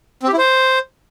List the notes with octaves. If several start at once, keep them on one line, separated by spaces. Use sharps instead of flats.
C4
G4
E4
C5